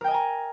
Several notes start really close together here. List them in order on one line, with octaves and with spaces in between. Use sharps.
A#4 G5 D#5 G#5 A#5